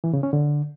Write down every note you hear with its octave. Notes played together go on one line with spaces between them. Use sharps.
E3
C#3
C#4
D3